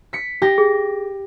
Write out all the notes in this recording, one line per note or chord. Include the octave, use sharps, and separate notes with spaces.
B6 C#7
G4 A#6
G#4